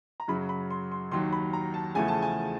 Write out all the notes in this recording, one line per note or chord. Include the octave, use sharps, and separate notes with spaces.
A#5
F#2 C#3 F#3 B5
B5
C6
C6
D#2 D#3 F#3 C6
B5
A#5
A5
E2 C#3 F3 A3 G#5
A5
G#5